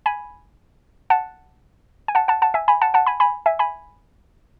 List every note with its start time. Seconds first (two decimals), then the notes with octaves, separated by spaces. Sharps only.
0.06 G#5 B5
1.10 F#5 A5
2.08 G#5
2.15 F#5 A5
2.28 F#5 A5
2.42 F#5 A5
2.54 E5 G#5
2.68 G#5 B5
2.82 F#5 A5
2.94 F#5 A5
3.07 G#5 B5
3.20 G#5 B5
3.46 E5 G#5
3.59 G#5 B5